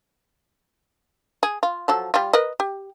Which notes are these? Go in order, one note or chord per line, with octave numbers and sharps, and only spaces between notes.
G#4
F4
F3 F#3 A4
G3 F4
A#4 B4 D#5
G4